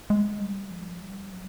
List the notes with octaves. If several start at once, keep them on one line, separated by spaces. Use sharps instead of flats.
G#3
G3
F3
G3
F#3